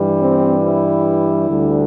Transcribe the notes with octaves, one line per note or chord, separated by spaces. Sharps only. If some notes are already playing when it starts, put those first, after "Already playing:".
Already playing: G2 E3 G3
C4
E4
D2 D3 G3